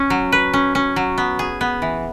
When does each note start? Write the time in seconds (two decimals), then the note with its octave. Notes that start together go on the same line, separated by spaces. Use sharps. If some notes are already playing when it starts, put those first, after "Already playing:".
Already playing: C#4
0.10 F#3
0.32 B4
0.53 C#4
0.75 C#4
0.96 F#3
1.18 B3
1.39 G#4
1.61 B3
1.82 E3